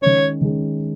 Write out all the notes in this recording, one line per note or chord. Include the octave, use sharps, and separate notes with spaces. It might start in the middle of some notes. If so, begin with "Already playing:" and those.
D#3 G#3 C#4 C#5
D#3 G#3 C#4